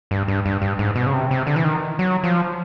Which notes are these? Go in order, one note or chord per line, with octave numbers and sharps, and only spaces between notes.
G2
G2
G2
G2
G#2
B2
C#3
C3
C3
D3
E3
D#3
F#3
F3